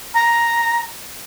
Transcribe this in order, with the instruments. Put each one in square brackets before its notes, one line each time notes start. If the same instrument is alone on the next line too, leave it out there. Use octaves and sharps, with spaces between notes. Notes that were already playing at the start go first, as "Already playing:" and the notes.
[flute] A#5